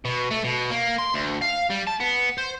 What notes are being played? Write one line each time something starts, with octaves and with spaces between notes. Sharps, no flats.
B2
A3
B2
A#3
C6
D2
F5
G3
A5
B3
C5